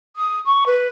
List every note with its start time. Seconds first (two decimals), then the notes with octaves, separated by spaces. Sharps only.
0.16 D#6
0.45 C#6
0.66 B4